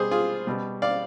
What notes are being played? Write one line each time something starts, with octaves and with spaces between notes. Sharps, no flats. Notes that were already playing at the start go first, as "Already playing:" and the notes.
Already playing: B2 G3 G#4 C5
F4 G#4
B2 G3
D5 F5